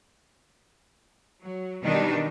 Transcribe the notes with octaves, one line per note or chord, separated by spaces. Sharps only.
F#3
B2 D#3 G3 D4 D#4